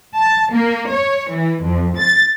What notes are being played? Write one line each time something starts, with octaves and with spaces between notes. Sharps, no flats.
A5
A#3
C#5
E3
F2
A6